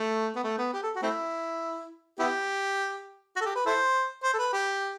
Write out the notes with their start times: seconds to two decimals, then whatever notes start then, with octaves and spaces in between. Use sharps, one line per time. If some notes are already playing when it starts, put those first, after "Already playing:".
Already playing: A3
0.36 B3
0.44 A3
0.58 B3
0.73 G4
0.83 A4
0.96 F#4
1.02 A3 C4 E4
2.19 B3 E4 G4
3.36 F#4
3.41 A4
3.46 G4
3.55 B4
3.66 E4 A4 C5
4.23 C5
4.33 A4
4.38 B4
4.53 G4